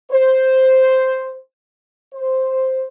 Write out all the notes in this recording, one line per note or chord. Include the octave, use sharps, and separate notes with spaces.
C5
C5